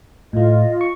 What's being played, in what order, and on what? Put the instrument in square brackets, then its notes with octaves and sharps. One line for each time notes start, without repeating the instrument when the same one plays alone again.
[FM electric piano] A2 A3 [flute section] F4 D#5
[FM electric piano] C#6